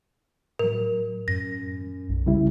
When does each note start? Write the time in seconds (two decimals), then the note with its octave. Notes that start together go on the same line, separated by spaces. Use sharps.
0.59 A2 F#3 A#4
1.28 F#2 A#6
2.09 B1
2.26 C#3 G3 E4